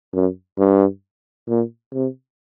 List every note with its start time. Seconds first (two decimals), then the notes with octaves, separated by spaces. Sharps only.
0.13 F#2
0.58 G2
1.48 A#2
1.93 C3